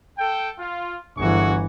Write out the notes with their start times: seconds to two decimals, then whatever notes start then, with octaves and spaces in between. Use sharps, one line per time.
0.18 A4 G5
0.59 F4
1.17 G1 E3 F#4 G#4 C#6